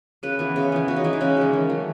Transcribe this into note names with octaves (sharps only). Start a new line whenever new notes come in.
C#3 B4
E3 B3
C#3
E3 B3
C#3 F#4
D#4
E3 G#3 E4
D#4
C#3 C#4
E3 G#3
D#3
F#3 A3